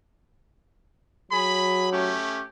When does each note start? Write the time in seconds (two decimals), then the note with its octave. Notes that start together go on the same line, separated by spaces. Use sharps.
1.32 F#3 G#4 B5
1.92 A3 C#4 G4